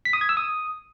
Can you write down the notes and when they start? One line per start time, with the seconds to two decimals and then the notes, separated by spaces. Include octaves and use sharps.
0.05 B6
0.13 D#6
0.21 G#6
0.29 E6
0.37 D#6